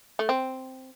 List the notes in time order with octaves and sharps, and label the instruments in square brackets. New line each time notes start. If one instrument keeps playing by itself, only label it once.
[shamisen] A3
C4